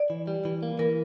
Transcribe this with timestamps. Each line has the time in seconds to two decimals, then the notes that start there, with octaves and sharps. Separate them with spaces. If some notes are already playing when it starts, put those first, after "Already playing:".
Already playing: D5
0.10 E3
0.27 G3
0.45 E3
0.63 A#3
0.79 E3 A#4